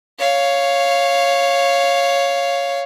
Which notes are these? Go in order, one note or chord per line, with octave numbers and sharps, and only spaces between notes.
C#5 F5